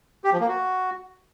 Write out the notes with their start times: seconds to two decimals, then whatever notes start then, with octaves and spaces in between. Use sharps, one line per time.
0.24 G4
0.32 F3
0.40 A#3
0.48 F#4